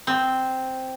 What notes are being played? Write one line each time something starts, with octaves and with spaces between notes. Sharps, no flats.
C4